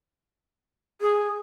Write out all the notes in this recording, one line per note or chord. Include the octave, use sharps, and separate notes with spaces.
G#4